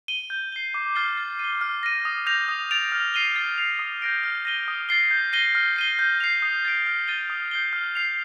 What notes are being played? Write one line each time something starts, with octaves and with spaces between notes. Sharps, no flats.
D#7 G7
G6
C7 G7
D6
F6 A6 C7 G7
A6
D#7 G7
F6
A#6 D#7
D#6
G6 A#6 F7
D#6
A6 D7 F7
F6
C7 D#7 G7
A6
C7 F7
D#6
G6 A#6 D7
F6
A#6 D#7 G7
D#6
A6 C7 G7
G6
A#6 D#7 G7
F6
C7 D#7 G7
G6
C7 F7
D#6
A6 D7
F6
A6 D#7 G7
D#6
G6 C7 G7
F6
C7 F7